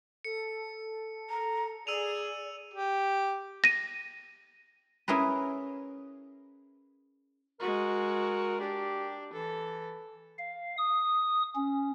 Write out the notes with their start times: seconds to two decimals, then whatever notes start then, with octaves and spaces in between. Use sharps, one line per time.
0.25 A4 C#7
1.30 A#5
1.87 G#4 D5 E6 D#7 F7
2.74 G4
3.64 A#6 D#7
5.08 C#4 E4 G#4 A#4 B4
7.60 G#3 F#4 A#4
8.60 D4 G4
9.33 E3 A4
10.38 F5
10.78 D#6
11.55 C#4